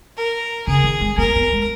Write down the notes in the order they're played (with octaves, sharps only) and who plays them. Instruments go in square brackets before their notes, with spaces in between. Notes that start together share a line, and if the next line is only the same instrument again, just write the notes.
[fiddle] A#4
[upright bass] C#3 [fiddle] G#4
[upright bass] D#3
G#3
[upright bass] A#3 [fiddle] A#4
[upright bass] B3
G#3